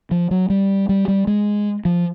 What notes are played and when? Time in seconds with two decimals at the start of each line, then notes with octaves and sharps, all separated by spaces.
0.11 F3
0.31 F#3
0.50 G3
0.89 G3
1.08 G3
1.27 G#3
1.85 F3